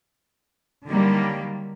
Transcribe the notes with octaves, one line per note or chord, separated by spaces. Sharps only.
D3 D#3 F#3 G3 A#3